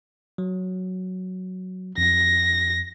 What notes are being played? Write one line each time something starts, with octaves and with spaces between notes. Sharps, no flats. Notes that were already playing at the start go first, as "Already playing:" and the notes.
F#3
F2 A#6